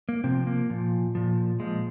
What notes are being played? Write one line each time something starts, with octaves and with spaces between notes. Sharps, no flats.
A#3
C3 F3 C4
A#3
A#2 F3
A#2 F3
A#2 F3 G#3